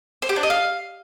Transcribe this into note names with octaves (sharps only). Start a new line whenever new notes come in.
C5
G4
D4
D#5
F5